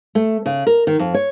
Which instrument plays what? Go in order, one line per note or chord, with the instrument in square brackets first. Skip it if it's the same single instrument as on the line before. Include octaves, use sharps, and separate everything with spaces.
[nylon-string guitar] A3
C#3
A#4
D#3
F2
C#5